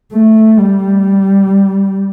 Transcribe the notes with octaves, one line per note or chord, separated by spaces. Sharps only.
A3
G3